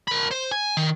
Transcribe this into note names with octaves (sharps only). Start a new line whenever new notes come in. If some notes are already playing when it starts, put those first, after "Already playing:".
A#4 B5
C5
G#5
D#3